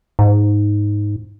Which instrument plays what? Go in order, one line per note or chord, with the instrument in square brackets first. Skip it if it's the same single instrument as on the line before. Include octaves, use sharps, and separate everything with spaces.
[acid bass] G#2